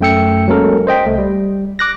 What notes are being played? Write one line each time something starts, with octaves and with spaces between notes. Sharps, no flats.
F#2 A3 G5 E6 C#7
F#3 G#3 A#3 C#4 A4 A#4
C5 D#5 G5 B6
C2 A3
G3
D6 F#6 A#6